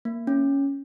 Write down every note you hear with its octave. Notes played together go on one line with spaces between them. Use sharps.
A#3
C#4